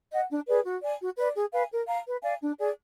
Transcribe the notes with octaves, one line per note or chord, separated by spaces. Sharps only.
D#5 F#5
D4
G#4 B4 D5
F#4
D5 G#5
F#4
B4 D5
G#4
B4 F5 G#5
A#4
F5 A#5
B4
D5 F5 G#5
D4
G#4 D5 G#5